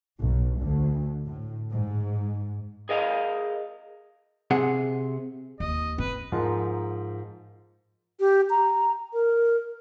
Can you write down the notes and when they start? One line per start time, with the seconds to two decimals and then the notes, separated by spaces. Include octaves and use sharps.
0.21 B1
0.62 D2
1.26 A2
1.71 G#2
2.89 G#4 A#4 D#5 F5
4.51 C3 G#4 F#5
5.60 D#2 D#5
5.98 C4 B4
6.32 G#2 F3 A#4 F#5
8.20 G4
8.50 A#5
9.13 A#4